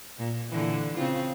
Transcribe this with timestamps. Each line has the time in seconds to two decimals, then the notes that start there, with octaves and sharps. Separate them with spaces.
0.18 A#2
0.50 A#2 D3 E3
0.96 C#3 C4 F4